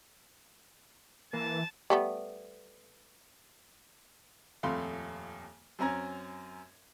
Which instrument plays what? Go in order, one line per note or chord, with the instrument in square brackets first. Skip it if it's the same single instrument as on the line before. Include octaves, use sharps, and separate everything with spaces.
[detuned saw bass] E3 [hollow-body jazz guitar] A#3 [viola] A5
[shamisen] G3 A3 B3
[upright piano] D#1 F2 A3 F5 B5 C6
F#2 C4 C#4 A#5 G#6